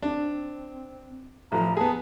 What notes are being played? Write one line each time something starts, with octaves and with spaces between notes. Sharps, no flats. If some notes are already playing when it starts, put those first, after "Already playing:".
C4 D4
A1 F3 A#5
B3 G#4 A5